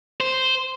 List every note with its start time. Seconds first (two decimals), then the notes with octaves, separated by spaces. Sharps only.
0.20 C5